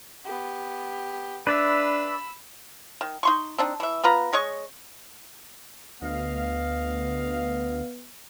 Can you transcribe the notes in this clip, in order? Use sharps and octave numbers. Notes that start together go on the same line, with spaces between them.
B3 G4
D4 B4 D5 E5 B5 E6
D#3
D#4 C6 C#6
C4 D4 D#4
E3 E5
B3 F4 B4 A#5
G#3 C#5 D#5 C#6
D2 B3 D#5 F5